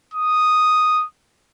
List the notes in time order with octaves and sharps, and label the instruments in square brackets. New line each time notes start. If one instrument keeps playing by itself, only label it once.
[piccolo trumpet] D#6